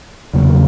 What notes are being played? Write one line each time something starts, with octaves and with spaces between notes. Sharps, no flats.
E2 C#3 F#3 A#3